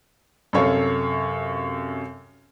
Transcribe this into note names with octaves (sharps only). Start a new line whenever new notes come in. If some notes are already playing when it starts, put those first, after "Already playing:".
F#2 C3 A4 C#5 F5